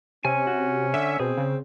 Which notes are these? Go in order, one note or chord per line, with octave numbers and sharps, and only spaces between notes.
C3 C#4 G#5
F#4
D3 E5
B2 C4 G#4
C#3